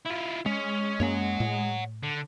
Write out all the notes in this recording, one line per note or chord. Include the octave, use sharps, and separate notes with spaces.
E4 F4
G#3 C#4
F#2 A#3 C#4 C#5 F#5
A2
D3